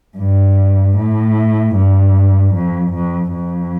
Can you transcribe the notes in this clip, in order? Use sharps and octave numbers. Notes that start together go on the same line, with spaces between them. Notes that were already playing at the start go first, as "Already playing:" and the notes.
G2
A2
G2
F2
F2
F2